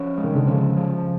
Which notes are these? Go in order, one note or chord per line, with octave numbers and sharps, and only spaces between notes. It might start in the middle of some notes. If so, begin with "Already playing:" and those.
Already playing: F3 C#4
G#3
D#3
D3
C#3 F3
F3